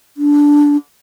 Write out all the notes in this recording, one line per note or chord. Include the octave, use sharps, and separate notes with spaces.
D4